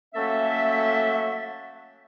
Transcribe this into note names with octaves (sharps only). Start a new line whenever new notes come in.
F#3 A3 A#3 C#4 A4 E5